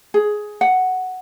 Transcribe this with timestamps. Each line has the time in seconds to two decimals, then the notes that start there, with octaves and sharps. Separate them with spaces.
0.14 G#4
0.61 F#5